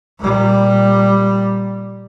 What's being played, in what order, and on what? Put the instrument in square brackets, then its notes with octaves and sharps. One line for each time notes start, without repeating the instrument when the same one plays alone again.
[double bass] A#2 G3